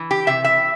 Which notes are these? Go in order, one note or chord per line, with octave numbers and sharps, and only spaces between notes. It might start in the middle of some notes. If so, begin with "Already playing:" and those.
Already playing: E3
G4
C3 E5
E5